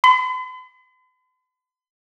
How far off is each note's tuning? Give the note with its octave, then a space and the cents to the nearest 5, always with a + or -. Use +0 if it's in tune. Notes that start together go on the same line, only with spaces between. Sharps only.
B5 +45